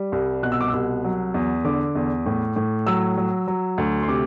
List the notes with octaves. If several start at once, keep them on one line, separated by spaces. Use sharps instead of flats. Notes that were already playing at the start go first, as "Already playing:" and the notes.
Already playing: G3
C2
B2 F#6
E6
D6
C2 E6
F#3
E2
D3 D6
E2
A2
A2
F#3 E6
F#3
F#3
D2
C6
C3 D6